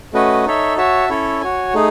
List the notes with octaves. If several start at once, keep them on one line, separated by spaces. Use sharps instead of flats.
A3 C#4 F#4 B4 D#5
D#4 A4 C#5 E5
F#4 C#5 E5 A5
C#4 E4 A4 C#5
F#4 C#5 G#5
A3 D#4 G#4